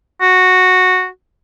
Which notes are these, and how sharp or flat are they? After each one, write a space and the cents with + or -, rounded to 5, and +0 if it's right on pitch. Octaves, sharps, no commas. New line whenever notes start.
F#4 -5